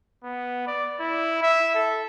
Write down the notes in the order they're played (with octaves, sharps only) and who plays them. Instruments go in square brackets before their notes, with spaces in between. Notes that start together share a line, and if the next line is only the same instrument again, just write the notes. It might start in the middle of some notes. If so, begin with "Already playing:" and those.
[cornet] B3
D5
E4
E5
A4